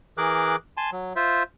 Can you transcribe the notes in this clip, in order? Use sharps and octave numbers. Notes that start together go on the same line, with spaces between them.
E3 G#4 A#4 D6 F#6
G#5 A5 C6
F#3
F4 C5 E5